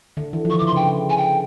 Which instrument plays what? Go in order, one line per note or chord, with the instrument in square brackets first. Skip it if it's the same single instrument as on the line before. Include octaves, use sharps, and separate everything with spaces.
[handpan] D3
E3
F3
[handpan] E3 [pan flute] C#6
[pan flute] D6
[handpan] D3
[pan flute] C6
[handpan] C#3
[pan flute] G5
[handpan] C#3
[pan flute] G#5
G5